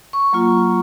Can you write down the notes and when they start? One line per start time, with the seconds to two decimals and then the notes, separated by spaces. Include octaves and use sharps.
0.13 C#6
0.33 F#3 A#3 F4